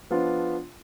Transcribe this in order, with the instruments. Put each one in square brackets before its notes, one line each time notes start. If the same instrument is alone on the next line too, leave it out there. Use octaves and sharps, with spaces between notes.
[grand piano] F3 B3 D4 F4